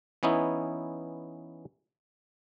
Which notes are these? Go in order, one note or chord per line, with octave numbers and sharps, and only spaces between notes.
E3 B3 C#4 D#4 E4